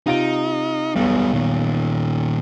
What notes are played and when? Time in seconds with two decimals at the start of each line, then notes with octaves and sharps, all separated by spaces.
0.06 C3 D#4 F4 D7
0.96 B1 E2 G3 B3
1.34 A#2 D#3